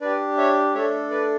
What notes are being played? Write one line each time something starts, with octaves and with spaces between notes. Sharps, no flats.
D4 G4 B4 D5
C#5 E5
A3 D4 A4 C#5 E5
B4 D5